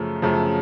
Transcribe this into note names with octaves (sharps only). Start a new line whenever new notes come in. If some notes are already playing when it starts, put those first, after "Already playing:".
Already playing: F#2 C#3 F3 A3
F#2 C#3 F3 A3